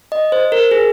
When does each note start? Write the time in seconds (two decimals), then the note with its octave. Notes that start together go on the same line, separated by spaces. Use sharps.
0.12 D#5
0.32 C5
0.52 A#4
0.71 G#4